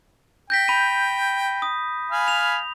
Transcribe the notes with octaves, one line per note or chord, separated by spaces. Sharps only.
G5 G6 A#6 B6
B5 D#7
D#6
F5 G#5 B5
F7